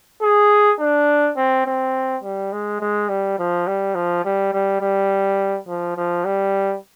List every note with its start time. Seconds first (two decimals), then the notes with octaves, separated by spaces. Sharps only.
0.22 G#4
0.80 D4
1.37 C4
1.66 C4
2.23 G3
2.52 G#3
2.81 G#3
3.09 G3
3.38 F3
3.67 G3
3.95 F3
4.25 G3
4.53 G3
4.81 G3
5.67 F3
5.97 F3
6.25 G3